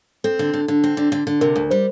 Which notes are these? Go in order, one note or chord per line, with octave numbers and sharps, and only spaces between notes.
C4 A4
D3
D3
D3
C4
D3
D3
D3
C3 A#4
D2
G3 C5